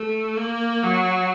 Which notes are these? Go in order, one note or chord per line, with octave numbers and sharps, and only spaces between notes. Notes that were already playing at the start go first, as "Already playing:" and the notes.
Already playing: A3
A#3
F#3